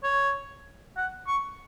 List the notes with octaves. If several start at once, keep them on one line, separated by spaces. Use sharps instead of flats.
C#5
F#5
C#6